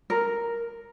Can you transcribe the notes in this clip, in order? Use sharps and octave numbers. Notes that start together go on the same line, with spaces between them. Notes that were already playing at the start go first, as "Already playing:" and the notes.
A#4